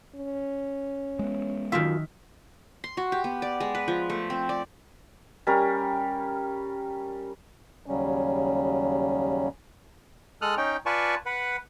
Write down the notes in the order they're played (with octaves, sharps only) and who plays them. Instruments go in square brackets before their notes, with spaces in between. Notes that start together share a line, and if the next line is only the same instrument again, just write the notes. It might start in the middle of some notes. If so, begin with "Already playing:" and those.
[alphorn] C#4
[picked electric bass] G#3 B3
[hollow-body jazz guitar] F#2 F4 F5 [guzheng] D#3 E5
[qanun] C6
F#4
G4
B3
D5
G#3
B4
F3
A3
C4
D5
[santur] G3 C#4 A#4
[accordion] D#2 C#3 F#3 G3 C#4
[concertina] G#3 A4 D#6 F6 F#6
C#4 D#4 G5
F4 B4 D5 G#5 A5 C#6
B4 F#5